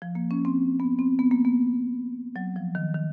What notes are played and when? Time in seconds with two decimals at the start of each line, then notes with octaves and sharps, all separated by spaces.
0.02 F3
0.15 A#3
0.31 C#4
0.45 C4
0.80 B3
0.99 C4
1.19 B3
1.31 A#3
1.45 B3
2.36 F#3
2.56 F3
2.75 D#3
2.94 D#3